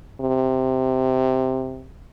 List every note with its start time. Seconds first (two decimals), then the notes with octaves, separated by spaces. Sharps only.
0.20 C3